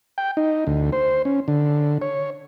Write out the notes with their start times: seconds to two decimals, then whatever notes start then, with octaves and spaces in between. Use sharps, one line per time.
0.18 G5
0.37 D#4
0.67 D2
0.93 C5
1.25 C#4
1.48 D3
2.02 C#5